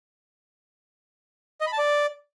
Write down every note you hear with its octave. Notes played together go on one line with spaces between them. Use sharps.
D#5
B5
A5
D5